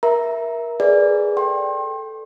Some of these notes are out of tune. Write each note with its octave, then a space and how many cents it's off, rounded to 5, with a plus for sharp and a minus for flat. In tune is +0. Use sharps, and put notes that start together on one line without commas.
A#4 +25 E5 +0 A#5 +5
G#4 +0 B4 +5 D5 +0
A4 +0 G5 +0 C6 +35